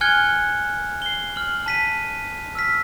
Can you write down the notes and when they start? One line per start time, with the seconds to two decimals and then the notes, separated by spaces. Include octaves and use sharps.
0.01 G#5 F6 F#6 G#6 C#7 G7
1.02 C7 G7
1.36 F6 F#7
1.66 A5 B6 D#7
2.55 E6 F6 B6